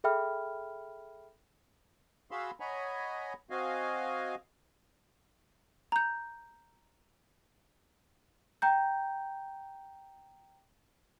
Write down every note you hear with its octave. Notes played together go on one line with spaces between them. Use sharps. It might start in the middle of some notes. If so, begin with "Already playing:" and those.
G#4 A4 E5 G5 B5 F6
F#4 G#4 F5 B5 C6 E6
C#5 D#5 F#5 G#5 A#5 B5
C4 F#4 D#5 F5 G#5
A#5 G6
G5 A#5 G6